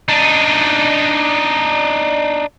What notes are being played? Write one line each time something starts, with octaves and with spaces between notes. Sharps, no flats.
D4 D#4